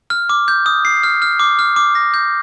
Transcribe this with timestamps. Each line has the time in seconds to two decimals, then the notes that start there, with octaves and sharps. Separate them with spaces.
0.10 F6
0.29 D6
0.48 G6
0.66 D#6
0.85 C7
1.03 F6
1.22 F6
1.40 D6
1.59 F6
1.76 D6
1.95 A#6
2.14 G6